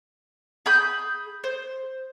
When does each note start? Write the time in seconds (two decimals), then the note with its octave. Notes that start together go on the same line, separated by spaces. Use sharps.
0.66 G#4 B5 G6
1.44 C5